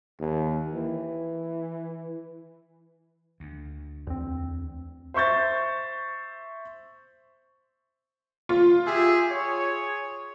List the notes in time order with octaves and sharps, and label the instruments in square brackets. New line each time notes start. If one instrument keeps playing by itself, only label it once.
[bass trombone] D#2
E3
[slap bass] D2
[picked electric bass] E2 C4
[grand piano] C5 E5 C#6 G6 A6
[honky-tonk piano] F4
[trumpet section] G4 G#4 E5
G#4 C#5